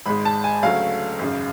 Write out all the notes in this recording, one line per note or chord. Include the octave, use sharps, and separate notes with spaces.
G#1 G#2 G#3 B5
A5
G#5
D2 C#3 F#3 A3 F5
G#1 F#2 C#3